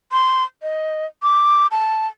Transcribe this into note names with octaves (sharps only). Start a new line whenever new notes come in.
C6
D#5
D6
A5